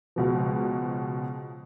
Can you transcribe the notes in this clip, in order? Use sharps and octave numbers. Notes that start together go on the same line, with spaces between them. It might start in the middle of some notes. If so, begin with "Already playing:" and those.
C#2 B2 F3